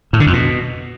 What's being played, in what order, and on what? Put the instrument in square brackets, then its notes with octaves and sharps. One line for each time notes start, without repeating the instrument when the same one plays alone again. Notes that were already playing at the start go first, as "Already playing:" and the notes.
[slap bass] A2
D3
F2
B2